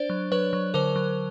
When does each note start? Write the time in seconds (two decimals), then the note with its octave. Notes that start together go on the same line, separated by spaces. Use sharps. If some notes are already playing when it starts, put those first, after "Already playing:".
Already playing: D4 C5 D5
0.10 F#3
0.32 F#3 B4 C#5
0.53 F#3
0.74 D3 A#4 C5
0.96 F#3